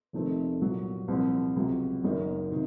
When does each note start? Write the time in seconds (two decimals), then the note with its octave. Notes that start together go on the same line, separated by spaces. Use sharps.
0.13 F1 F2 D#3 A3 C4
0.61 C2 A#2 F#3 C4
1.08 C2 A#2 F3 C4
1.56 C#2 C3 F#3
2.04 F#1 F#2 D#3 A#3 D#4
2.51 C3 D#3